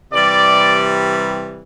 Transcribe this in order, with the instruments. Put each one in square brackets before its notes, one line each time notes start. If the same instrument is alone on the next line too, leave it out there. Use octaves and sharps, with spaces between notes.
[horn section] C3 E3 G3 D5